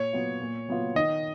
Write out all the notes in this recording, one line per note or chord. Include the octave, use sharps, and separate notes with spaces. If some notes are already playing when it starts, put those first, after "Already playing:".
Already playing: A#2 C#5
F#3 B3 F4
A#2
F#3 B3 F4
D#3 D#5